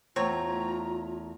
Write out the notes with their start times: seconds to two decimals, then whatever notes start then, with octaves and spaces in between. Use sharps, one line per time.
0.16 E2 A3 C4 F4 C#5 A#5